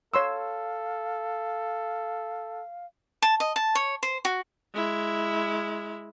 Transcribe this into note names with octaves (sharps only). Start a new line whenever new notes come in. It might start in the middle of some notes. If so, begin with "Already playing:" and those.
A4 C#5 F5 C6 E6
A5
D#5
A5
C#5
C5
F#4
G#3 E4